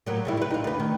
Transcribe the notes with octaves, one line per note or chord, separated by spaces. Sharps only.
A2 F#3 A#3
C#3 G3 E4
E4 B4
D#4 F4
D2 B4
D#3